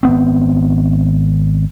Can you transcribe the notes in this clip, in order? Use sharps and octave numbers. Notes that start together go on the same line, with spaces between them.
G#1 B3 C4